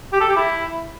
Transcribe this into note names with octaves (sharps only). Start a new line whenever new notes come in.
G4
A4
G4
E4